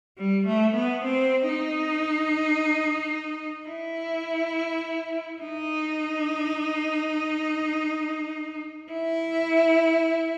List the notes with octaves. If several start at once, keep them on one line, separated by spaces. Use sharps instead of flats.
G3
A3
B3
C4
D#4
E4
D#4
E4